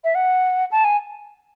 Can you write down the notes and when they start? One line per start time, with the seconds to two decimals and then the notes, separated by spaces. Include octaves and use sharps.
0.04 E5
0.15 F#5
0.72 A5
0.84 G#5